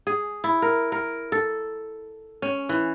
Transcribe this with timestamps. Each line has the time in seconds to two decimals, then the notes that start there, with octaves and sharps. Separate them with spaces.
0.07 G#4
0.44 E4
0.62 A#4
0.92 A#4
1.32 A4
2.42 C#4
2.69 E3